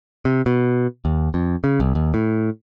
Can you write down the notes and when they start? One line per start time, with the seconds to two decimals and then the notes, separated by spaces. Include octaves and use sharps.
0.25 C3
0.46 B2
1.05 D#2
1.34 F2
1.64 C#3
1.80 C2
1.95 D#2
2.14 A2